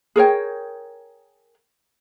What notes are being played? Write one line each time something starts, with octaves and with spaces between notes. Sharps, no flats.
G#4 A#4 C#5 G5